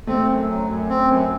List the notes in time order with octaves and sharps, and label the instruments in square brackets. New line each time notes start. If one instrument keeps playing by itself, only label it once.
[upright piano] A3 [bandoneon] C4
[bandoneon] F#2
F#3
F#2
C4
F#2